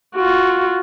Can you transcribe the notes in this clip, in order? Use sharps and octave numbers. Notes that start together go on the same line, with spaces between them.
F4 F#4